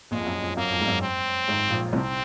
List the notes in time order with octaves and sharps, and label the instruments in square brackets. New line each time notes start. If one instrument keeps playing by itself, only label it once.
[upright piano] A#1 A#2 [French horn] G#3
[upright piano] F2
F#2
F2
[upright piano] F#2 [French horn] A#3
[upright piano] F2
G#2
F#2
[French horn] C4
[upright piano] G#1 G#2
A#1 A#2
[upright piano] C2 C3 [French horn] C4